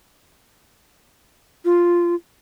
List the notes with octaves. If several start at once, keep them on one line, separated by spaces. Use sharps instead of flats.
F4